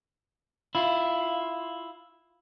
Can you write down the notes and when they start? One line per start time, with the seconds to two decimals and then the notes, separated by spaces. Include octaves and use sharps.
0.75 E4 F4